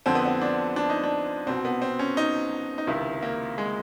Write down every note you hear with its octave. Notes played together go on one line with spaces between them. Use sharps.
F2 D3 C4
B3
C4
D4
D4
D#4
D4
C2 B2 C4
B3
C4
C#4
D#4
D#4
C#2 C3 D#3 E4
A#3
G#3